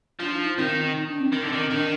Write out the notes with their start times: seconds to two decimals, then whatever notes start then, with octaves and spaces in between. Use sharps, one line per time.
0.20 F3 D4
0.32 D#4
0.45 D#4
0.58 D#3 C4
0.95 D#4
1.08 D4
1.20 C4
1.33 D#3
1.43 D3
1.53 D#3
1.70 D#3 D4